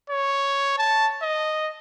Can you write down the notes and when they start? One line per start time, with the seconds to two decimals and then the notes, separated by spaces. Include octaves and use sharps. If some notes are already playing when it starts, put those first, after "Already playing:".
0.10 C#5
0.78 A5
1.22 D#5